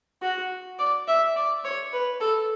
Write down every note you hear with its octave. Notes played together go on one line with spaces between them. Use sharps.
F#4
D5
E5
D5
C#5
B4
A4